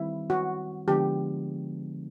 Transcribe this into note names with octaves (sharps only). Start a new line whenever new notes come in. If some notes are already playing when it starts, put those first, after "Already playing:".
Already playing: D#3 G3 C4 E4
F#4
D3 F3 G#3 B3 D4 G4